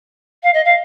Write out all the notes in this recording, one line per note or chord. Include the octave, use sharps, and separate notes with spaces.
F5
D#5
F5